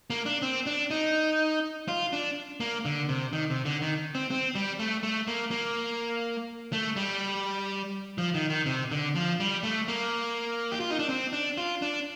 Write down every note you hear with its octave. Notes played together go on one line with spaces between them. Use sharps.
A#3
D4
C4
D4
D#4
F4
D4
A#3
D3
C3
D#3
C3
D3
D#3
C4
C4
G3
A3
A3
A#3
A#3
A3
G3
F3
D#3
D#3
C3
D3
F3
G3
A3
A#3
G4
F4
D#4
D4
C4
D4
F4
D4